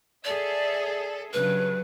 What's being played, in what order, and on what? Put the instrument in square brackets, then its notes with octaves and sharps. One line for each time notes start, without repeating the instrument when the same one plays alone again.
[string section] G#4 A4 E5 [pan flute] D5
[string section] G2 C#3 F#3 [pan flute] B4